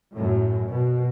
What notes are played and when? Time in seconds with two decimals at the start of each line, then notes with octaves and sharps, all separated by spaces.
0.12 F#2 A2
0.65 B2